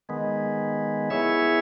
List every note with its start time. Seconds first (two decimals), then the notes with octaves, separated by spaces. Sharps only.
0.09 D#3 G#3 B3
1.10 B3 E4 G#4 C#5 E5